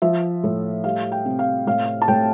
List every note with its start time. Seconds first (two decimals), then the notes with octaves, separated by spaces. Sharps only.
0.02 F3 E5
0.44 A2
0.84 G3 F5
1.12 G5
1.26 C3
1.39 F5
1.67 A2 F5
2.02 A5
2.08 A2 G5